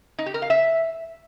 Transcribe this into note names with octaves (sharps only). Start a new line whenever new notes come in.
D#4
G4
A#4
F5
E5